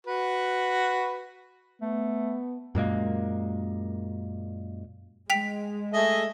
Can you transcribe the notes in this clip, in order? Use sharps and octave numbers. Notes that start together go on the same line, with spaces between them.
F#4 B4
A3 B3
F#2 A#2 G#3 A#3
G#3 G5 B6 F7
A3 G#4 D#5 E5